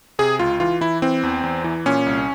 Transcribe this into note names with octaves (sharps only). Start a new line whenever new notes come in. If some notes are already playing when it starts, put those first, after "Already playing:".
C3 G#4
C#2 F4
E3 F4
E3 E4
E3 C4
E2
E2
E3
A#2 C#4
C2